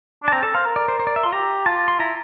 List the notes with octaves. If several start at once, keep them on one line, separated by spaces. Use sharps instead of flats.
D4
A5
C4 A#5
A4 A5
C5 F5
A#4
D5
C5
C5
D5
E5
F4 C6
G4 A#5
F4 A5
C6
E4 A#5